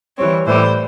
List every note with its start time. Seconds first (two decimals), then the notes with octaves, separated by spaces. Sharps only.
0.18 E3 G3 C4 C#5
0.47 A2 E3 G3 C5